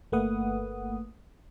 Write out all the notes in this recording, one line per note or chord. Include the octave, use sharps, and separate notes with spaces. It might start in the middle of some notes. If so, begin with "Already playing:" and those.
G1 A3 A#3 B4 F#5 D#6